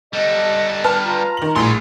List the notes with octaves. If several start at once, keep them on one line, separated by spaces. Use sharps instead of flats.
G3 A4 D#5 F#6
B4 A5 F6
F4 A#5
D#3 F#7
A#1 A2 G#4 C6